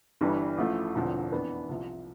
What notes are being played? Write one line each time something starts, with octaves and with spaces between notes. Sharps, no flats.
G1 G2 E3 G3
A1 A2 F3 A3
E1 E2 D3 F3 C4
F2 E3 B3 D4
C2 C3 F3